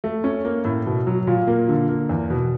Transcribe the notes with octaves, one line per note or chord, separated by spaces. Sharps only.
A3
C#4
A#3
A2
B2
F#3
A#2
A#3
D3
A#3
E2
B2